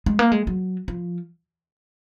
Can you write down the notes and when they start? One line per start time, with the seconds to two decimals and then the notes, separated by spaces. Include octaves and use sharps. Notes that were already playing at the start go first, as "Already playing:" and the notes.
0.06 G#3
0.19 A#3
0.32 G#3
0.47 F#3
0.88 F3